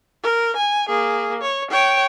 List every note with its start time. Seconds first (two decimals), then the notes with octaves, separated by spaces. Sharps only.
0.23 A#4
0.56 G#5
0.89 A#3 G#4
1.42 C#5
1.71 C#5 G5